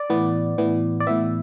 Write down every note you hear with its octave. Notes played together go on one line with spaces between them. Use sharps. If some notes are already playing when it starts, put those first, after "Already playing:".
Already playing: D5
A2 E3 B3
A2 E3 B3
D5
A2 E3 B3 E5